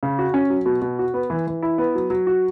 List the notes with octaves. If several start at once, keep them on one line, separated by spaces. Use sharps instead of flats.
C#3
F#4
C#4
F#3
B2
B2
F#4
B3
E3
E3
E4
B3
F#3
F#3
F#4